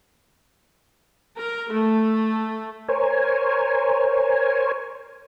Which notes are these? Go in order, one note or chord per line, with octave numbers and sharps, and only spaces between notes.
A#4
A3
A#4 C5 C#5 G#5